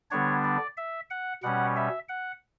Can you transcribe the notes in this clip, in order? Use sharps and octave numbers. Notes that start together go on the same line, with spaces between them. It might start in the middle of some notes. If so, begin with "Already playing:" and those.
D3 G3 B3 D4 C#5
D5
E5
F#5
B2 G3 C#4 F#5
E5
F#5